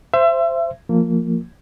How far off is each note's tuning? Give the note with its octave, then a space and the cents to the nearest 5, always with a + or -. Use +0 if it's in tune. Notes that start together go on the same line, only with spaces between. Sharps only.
C5 +0 E5 +30
F3 +0 A#3 -20